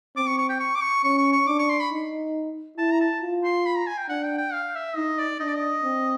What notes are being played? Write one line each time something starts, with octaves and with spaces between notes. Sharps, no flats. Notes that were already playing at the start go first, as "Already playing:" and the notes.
C4 D6
C#6
C#6
G5
C#6
D6
C#6
C#4 C#6
C#6
C#6
D4 D6
C#6
C6
B5
D#4
E4 A5
A#5
A5
F4
C6
B5
A#5
G#5
G5
D4 F#5
G5
G5
F5
E5
D#4 D#5
D5
D4 D#5
D5
D#5
C4